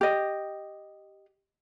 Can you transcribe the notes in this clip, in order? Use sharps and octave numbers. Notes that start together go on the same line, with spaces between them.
G4 D#5